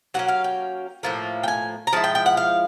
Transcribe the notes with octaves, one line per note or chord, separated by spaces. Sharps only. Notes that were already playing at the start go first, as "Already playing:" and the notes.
F#3 A#3 C#4 F#5
F5
G5
A2 F3 A#3
G5
G#5
A#5
F3 G#3 E4 A5
G5
G5
F#5
F5